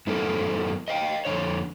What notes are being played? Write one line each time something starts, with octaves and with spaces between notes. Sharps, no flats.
F#2 F#3 B3 E4 A4 A#4
D#5 F5 G5
F2 D3 C#5